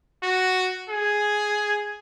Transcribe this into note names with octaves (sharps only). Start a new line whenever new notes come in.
F#4
G#4